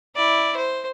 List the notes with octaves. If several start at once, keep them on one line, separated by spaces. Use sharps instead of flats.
E4 D5
C5